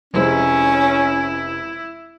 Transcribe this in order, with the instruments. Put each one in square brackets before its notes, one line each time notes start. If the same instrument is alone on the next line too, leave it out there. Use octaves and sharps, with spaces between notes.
[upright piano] F1 G#3 C5 [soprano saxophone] C#4 [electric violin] E4